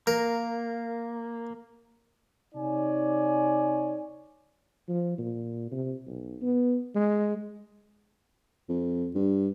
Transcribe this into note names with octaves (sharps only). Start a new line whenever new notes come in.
A#3 A#4
C3 D#4 C#5 D5 G#5
F3
A#2
C3
B1
B3
G#3
F2
G2